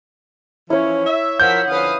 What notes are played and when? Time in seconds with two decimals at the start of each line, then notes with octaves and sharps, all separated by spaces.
0.70 E3 F3 C#4 E4 C#5
1.07 E5
1.40 F3 A#4 F#5 E6 G6 B6
1.69 D3 F3 C#4 B4 F5 D#6